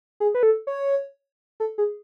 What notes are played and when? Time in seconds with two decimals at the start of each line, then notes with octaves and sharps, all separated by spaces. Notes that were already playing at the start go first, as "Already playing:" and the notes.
0.20 G#4
0.35 B4
0.43 A4
0.67 C#5
1.60 A4
1.78 G#4